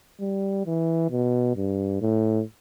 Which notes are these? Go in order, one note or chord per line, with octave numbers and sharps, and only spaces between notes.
G3
E3
B2
G2
A2